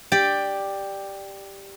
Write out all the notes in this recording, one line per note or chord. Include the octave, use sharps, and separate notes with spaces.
G4 D5